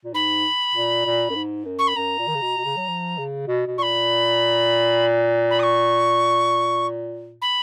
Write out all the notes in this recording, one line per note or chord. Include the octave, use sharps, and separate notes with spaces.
A#2
G#2 B5
A#2
A#2
F#2
G#2
F#2
C#6
B5
F#2 A#5
A#2
D#3
C#3
B2
B2
C#3
F#3
F3
C#3
B2
B2
A#2 B5 C#6
B5
D#6
C#6
B5